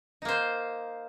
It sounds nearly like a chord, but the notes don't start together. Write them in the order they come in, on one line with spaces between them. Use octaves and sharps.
D#4 A#3 C5